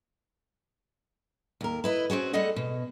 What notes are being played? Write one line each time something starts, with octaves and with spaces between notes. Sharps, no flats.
D#2 A#4
E4 B4 D#5
C4 C#4 F#4 G#4
G3 A3 G#4 A4 D#5 F#5
B2